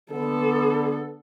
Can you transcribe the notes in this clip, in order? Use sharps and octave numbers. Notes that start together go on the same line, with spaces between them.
D3 B3 A4